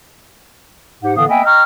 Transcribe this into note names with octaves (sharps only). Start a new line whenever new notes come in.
G#2 G4 F#5
A2 D3 E3 B3 F5 D#6
A#3 B3 D#5 E5 G5 G#5
D#5 G5 A#5 C#6 F6